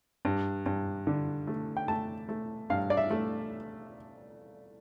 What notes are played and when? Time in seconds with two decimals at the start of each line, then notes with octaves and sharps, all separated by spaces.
0.25 G2
0.66 G2
1.07 D3
1.47 A3
1.77 G5
1.88 A3 A5
2.29 A3
2.70 G2 F5
2.90 D5
2.97 E5
3.11 A3